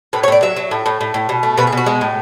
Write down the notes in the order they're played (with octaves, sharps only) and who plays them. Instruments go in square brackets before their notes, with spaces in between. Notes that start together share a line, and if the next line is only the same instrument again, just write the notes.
[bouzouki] A2 B4
C#5
A2 D5
F#3 E5
F#3
A2
A2
A2
A2
B2
A3
B2 B4
G#4
B2 F#4
G#3
A2